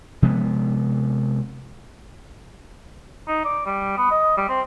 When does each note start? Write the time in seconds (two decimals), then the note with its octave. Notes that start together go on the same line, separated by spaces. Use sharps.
0.22 C3 F3 G#3 B3
3.28 D#4
3.44 D5
3.66 G3
3.97 B3
4.11 D#5
4.37 G3
4.49 C4